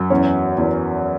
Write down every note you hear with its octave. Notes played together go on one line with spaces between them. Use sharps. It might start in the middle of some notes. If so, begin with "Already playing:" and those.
Already playing: F#2
E2 C#4 C#5
E2